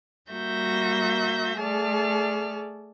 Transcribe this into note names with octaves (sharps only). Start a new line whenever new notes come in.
G3 A#3 F#4 E5 G6 A#6
A3 G#4 D5 A5 F6